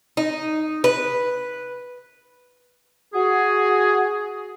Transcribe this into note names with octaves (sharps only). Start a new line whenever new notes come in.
D#4
B4
F#4 G#4